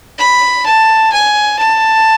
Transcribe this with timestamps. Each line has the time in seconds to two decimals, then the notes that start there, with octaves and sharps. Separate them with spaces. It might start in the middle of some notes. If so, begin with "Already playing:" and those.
0.19 B5
0.66 A5
1.12 G#5
1.58 A5